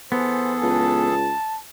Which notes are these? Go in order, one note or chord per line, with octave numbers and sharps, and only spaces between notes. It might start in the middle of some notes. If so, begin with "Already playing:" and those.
E3 B3 G#4 A4 C5
C#2 A5